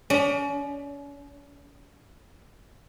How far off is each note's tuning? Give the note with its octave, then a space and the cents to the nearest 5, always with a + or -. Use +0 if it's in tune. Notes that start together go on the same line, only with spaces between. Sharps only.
C#4 +40 D5 +35